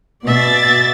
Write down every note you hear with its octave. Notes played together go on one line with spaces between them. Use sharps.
B2 D5 E5 A6